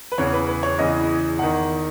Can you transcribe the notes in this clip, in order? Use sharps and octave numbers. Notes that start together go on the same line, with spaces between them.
B4
E2 C#3 E3 C#5
B4
B4
C#5
E2 C#3 E3 D#5
E2 D#3 F#5